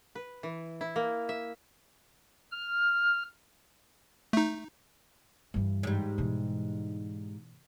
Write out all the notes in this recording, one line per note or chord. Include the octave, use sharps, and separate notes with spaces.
B4
E3
E4
A#3
E5
F6
A3 D#4
G2 E3
G#2 G3
B2 E3